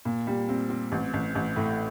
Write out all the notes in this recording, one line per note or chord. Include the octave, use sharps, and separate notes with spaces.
A#2
G3
C4
C4
A1
A1
A1
A2